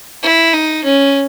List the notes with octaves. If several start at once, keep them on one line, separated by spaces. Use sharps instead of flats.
E4
D#4
C#4